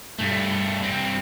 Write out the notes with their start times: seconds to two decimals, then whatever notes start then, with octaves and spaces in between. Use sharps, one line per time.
0.19 G2 A3
0.82 G2 C4